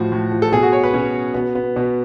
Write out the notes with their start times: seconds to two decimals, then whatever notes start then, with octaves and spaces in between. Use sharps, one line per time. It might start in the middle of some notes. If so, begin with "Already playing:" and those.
Already playing: A2 F3 F#4
0.12 A2
0.32 F3
0.42 A4
0.52 B2 G#4
0.63 F#4
0.73 C#5
0.83 B4
0.93 B2 C#4
1.34 B2 B3
1.55 B3
1.76 B2